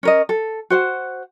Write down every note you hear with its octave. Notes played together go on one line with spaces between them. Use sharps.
C#4 A#4 D#5
A4
F#4 C5 F#5